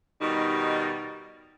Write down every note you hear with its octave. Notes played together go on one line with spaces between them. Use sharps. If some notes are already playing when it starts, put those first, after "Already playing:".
B2 D#3 G3 D#4